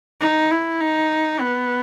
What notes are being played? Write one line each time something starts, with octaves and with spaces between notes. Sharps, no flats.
D#4
E4
D#4
B3